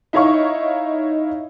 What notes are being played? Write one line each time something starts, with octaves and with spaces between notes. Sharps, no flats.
D#4 E4 C#5 D#5 F5 C#6